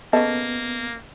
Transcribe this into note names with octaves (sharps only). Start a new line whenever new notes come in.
C#3 A#3 B3 A4 D#5